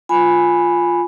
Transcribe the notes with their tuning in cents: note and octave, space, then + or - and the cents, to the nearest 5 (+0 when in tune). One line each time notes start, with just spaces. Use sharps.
F4 +0 G#5 +0 B5 +0